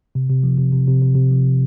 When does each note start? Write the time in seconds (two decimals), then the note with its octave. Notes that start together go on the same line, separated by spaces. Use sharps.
0.15 C3
0.30 C3
0.43 F3
0.58 C3
0.72 C3
0.88 C3
1.02 C3
1.15 C3
1.31 F3